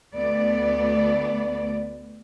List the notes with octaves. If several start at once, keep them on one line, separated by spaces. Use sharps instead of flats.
D2 A3 B3 D5